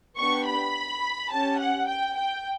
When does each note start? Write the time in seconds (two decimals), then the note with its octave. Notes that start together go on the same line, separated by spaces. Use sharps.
0.17 B3 D4 G4 C#6
0.45 B5
1.31 C#4 G4 A5
1.59 F#5
1.87 G5
2.16 G5